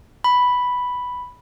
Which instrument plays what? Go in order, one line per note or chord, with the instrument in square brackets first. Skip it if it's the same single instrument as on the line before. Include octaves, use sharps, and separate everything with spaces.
[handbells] B5